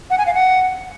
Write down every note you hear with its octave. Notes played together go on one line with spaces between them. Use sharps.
F#5
G#5
F5
F#5